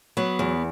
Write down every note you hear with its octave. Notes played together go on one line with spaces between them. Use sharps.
F#3 B3
E2